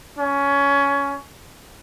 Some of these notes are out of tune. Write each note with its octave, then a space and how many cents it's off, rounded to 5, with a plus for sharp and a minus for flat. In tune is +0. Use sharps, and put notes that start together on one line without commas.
C#4 +20